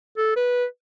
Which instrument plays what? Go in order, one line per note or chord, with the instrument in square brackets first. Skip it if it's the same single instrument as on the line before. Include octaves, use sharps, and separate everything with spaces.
[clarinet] A4
B4